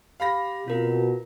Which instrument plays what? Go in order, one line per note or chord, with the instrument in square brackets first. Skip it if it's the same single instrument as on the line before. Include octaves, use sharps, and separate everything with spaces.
[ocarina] G4 [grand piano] F5 B5 A#6
[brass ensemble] B2 [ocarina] C4 [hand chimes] F4 A#4